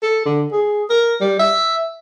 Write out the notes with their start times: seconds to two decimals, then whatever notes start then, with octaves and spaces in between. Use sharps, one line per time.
0.02 A4
0.25 D3
0.52 G#4
0.90 A#4
1.21 G3
1.39 E5